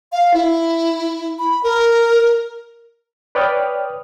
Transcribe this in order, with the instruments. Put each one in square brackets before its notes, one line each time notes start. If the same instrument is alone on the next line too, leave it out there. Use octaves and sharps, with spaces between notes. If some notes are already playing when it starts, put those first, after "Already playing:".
[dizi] F5
E4
B5
A#4
[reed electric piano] B4 C#5 D5 G5 D#6 F6